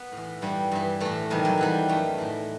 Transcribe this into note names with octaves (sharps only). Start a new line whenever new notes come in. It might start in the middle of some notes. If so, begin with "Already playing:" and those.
Already playing: B3
A2
E3
G2 E3 G3
G2 E3
A2 E3 A3
E2 C3 D#3 G3
F#3
E2 C3 E3 G3
F#2 D#3 A3
A2 E3